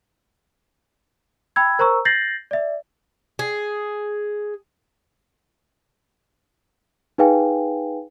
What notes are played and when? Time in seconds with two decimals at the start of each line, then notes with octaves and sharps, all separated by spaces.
1.56 G5 B5 E6 G#6
1.79 A#4 C5 A#5 C#6 E6
2.05 G6 A6 A#6 C7 F#7
2.51 D5 E5
3.39 G#4
7.18 D#4 G#4 B4 F5 G5 G#5